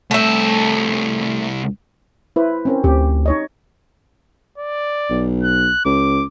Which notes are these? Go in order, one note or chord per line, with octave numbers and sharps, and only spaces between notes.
C2 A3 E5 A5
E4 B4 C5
C4 C#4 A#4
D2 C4 G4
D#4 C#5 D#5
D5
B1
F#6
C#2 D6